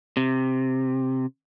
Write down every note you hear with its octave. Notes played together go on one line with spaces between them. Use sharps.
C3